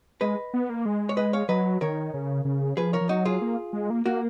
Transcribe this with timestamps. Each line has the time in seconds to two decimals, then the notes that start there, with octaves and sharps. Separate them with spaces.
0.21 G#3 B4 D#5
0.54 B3
0.69 A#3
0.86 G#3
1.09 C#5
1.17 B4 D#5
1.33 C#5 F5
1.49 F#3 B4 D#5
1.81 D#3 A#4 C#5
2.14 C#3
2.45 C#3
2.77 F3 G#4 B4
2.93 A#4 C#5
3.01 F3
3.09 F#3 D#4 F#4
3.25 F4 G#4
3.42 A#3
3.73 G#3
3.90 A#3
4.06 A#3 F#4 A#4